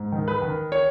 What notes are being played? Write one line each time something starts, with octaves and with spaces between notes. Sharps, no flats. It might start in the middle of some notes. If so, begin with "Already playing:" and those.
Already playing: G#2
D#3
B4
D#3
C#5